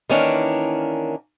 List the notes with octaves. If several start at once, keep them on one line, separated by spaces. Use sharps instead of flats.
D#3 E3 A#3 C#4 D4